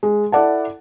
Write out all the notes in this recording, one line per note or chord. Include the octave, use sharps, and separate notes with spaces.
G#3
E4 A4 D5 F#5 A5